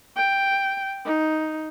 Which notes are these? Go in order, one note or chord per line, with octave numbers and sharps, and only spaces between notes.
G5
D#4